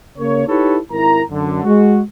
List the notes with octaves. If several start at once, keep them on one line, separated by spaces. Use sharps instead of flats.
C#3 A#3 A#4 C#5
D#4 E4 G4 A4 B4 C#5
G#1 E4 A#4 A#5
F#2 D3
G#3 F#4